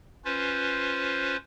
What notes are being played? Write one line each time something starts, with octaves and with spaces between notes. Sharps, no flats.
C#4 F4 B4 C5